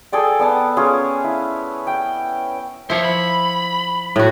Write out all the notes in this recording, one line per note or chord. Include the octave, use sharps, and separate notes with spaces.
G#4 A4 D5 G5
B3 D5 F#5 A5
C#4 F4 G#4 C#5
E4
G5
F3 E4 C5 C#5
B5
A2 F#4